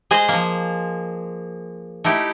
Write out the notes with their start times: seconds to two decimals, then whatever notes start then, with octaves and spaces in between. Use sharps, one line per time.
0.11 G#3 G#4 C5 D#5
0.29 F3 A#3
2.04 A3 D#4 E4 G4